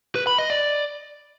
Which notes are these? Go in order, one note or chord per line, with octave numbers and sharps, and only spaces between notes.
B4
B5
D#5
D5